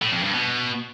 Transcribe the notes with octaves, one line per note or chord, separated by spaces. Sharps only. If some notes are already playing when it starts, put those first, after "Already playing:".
A2
F2
G2
B2